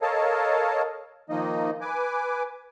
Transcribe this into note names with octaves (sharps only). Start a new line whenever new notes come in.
A4 A#4 C#5 D#5 F5 A5
D#3 F3 A#3 D#4 D#5
B4 G#5 D6